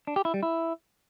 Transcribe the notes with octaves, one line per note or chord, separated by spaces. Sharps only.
D4
G4
E4
G3
E4